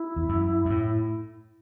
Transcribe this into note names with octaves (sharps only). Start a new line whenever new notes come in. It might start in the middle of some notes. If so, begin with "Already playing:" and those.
Already playing: E4
E2
F#2
F#2
A2